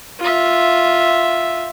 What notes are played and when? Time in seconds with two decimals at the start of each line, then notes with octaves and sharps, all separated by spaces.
0.20 F4 E5